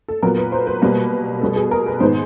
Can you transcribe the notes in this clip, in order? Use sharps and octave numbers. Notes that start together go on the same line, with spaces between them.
A4
A#2 F#3 B3 A#4
B4
C5
B4
B2 G3 A#3
B2 G3 B3 A4
G#4
A#4
B4
G#2 D#3 G#3 B3 C5